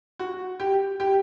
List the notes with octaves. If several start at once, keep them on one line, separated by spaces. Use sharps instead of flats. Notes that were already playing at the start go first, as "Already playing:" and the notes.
F#4
G4
G4